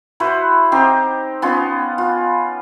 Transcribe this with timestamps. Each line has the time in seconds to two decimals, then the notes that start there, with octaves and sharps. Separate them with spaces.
0.20 E4 F#4 B4 C5
0.72 C4 D#4 G4
1.42 B3 C#4 F4 D#5
1.98 F4